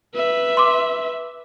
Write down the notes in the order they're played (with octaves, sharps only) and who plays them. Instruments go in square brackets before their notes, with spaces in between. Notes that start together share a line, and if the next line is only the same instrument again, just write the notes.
[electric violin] B4 E5
[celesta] C6 D6